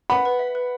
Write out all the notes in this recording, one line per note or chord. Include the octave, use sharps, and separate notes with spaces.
B4 F#5 B5
B4
E5
B4